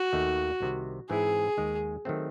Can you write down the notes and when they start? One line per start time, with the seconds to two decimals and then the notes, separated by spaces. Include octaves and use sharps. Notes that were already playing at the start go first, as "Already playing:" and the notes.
Already playing: F#4
0.13 D#2 D#3 A3 D#4
0.60 C2 C3 D#3
1.09 G#2 E3 C4 E4 G#4
1.57 D#2 D#3 G#3
2.05 D#3 F#3 A3 C4